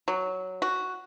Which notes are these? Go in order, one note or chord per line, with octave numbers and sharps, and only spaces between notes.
F#3
F#4